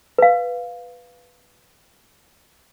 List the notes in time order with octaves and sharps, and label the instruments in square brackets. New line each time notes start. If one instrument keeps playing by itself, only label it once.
[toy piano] B4 F5